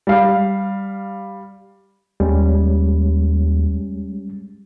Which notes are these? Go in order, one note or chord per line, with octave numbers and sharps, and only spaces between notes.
G3 F5
D#2 G3 G#3 C#4